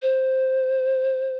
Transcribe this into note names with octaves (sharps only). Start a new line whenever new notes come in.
C5